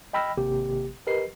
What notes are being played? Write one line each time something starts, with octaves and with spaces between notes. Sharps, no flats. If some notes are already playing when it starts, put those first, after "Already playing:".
D#5 G5 B5 E6 F6 A#6
G#1 C3 A#3 G4
G4 A#4 B4 D#5 C7